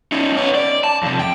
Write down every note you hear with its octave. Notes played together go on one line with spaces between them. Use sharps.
C#4 D#4
B3 C#5
D5
A5
F2 C3
G5